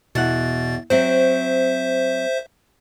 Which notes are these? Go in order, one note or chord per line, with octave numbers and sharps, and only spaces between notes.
E2 B2 F#5 A6
F#3 C4 C5 E5